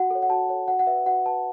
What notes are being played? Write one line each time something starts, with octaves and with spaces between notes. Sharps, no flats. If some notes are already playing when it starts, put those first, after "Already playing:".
Already playing: F#4 F#5
A4 C#5
F#5
F#4 A5
A4 C#5
F#4 F#5
F#5
B4 E5
F#4 F#5
B4 A5